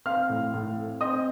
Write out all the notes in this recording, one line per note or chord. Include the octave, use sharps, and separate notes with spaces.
C4 F5 F6
A2
A2
C4
C4 D#5 D#6